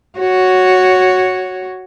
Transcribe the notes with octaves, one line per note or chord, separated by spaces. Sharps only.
F#4 C#5